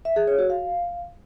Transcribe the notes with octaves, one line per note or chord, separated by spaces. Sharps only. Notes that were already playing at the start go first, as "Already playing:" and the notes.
E5
G#4
C#5
F#4
F5